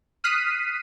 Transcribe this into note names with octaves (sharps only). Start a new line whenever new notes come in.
D#6 F6 F#6 B6 C7 D#7